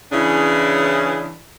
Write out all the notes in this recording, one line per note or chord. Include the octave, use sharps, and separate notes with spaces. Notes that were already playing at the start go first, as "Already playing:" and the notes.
C#3 E3 C#4 D4 E4 G#4